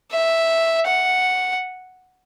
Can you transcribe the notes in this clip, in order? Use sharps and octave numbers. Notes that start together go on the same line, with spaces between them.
E5
F#5